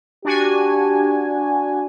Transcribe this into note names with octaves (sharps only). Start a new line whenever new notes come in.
D4 F#4 G4 G#5